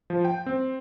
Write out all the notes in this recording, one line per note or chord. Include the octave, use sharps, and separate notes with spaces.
F3
G5
C4